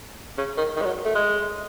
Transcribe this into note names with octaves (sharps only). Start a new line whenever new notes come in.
C#3
D#3
D#3
G#3
F#3
A3
G#3